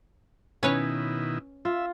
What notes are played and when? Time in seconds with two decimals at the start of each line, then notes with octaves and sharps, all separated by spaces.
0.63 B2 D#3 C#4 E4 B4 C#5
1.65 F4 E5